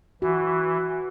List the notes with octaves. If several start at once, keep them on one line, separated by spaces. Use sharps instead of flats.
E3 F#4